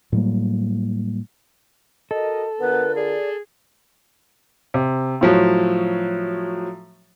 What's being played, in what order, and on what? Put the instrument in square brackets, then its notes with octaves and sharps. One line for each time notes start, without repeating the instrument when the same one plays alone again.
[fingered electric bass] A2 F#3 G3 A#3
[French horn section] F#4 A#4 D#5 [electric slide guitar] A4
[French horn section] D3 F4 A#4 [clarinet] B3 [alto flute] B4
[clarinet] G#4 [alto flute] D5
[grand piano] C3
A2 F3 F#3